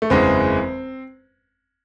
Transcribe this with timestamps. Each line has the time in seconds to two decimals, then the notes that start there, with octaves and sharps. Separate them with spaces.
0.02 A3
0.10 F#1 E2 C#3 E3 G#3 C4